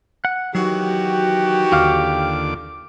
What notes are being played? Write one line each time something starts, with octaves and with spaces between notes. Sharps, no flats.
F#5
D#3 E3 F#3 F#4 G4
D#2 D3 F4 F5 D6